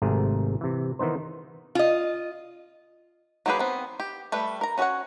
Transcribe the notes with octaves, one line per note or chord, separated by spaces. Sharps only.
G#1 G#2 C3 A3 G#4 A#4
C3 E3
D#3 E3 B3 D#4 C5
F4 D#5
F#3 A#3 G4 G#4 B4
B3 C4
G4
G3 A3 B4
A#4 A#5
C#4 F#4 G#4 C#5 F#5